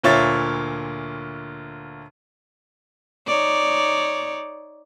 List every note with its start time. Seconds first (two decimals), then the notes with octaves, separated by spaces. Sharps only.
0.03 D2 A#2 F4 C#5 E5 A6
3.27 D#4 C#5 D5